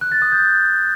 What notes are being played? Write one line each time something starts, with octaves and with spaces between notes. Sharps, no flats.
F#6
A6
D#6
G6